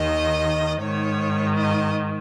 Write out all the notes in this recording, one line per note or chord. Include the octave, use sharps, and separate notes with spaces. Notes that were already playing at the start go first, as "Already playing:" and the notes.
Already playing: D#2 D#3 D#5
G#2 D#3 C#5
D#5